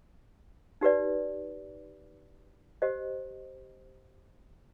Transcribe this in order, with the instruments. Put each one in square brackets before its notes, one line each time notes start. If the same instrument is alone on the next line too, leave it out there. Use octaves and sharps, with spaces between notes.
[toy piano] D#4 G4 B4 D5
G4 C5 D#5